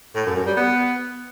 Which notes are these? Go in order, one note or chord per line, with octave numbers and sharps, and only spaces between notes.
A2
F#2
F#2
G3
B3